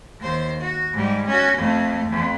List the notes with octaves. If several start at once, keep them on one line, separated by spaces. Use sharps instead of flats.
D#2 C5
F#4
G#2 G3
C#4 F#4
F2 A3
F2